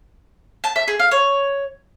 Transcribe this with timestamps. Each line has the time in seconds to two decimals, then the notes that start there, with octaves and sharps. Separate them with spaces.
0.64 A5
0.76 E5
0.88 G#4
0.99 F5
1.11 C#5